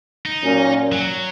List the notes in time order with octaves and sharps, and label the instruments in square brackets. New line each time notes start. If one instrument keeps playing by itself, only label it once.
[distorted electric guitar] D#4
[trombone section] A#2 F#3 C#4
[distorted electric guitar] F#3